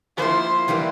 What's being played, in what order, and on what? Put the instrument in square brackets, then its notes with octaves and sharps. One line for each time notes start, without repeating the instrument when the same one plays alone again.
[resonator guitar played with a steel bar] F3 A#3 E4 [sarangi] C5
[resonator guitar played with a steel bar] C3 E3 G3 A#3 E4